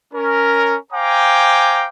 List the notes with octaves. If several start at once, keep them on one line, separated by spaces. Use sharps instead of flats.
C#4 A#4
C5 F5 G5 G#5 A#5 D6